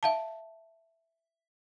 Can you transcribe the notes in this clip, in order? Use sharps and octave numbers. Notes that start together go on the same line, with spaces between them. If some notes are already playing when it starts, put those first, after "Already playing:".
E5 F5 A5